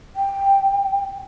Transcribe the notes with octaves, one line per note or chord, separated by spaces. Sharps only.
G5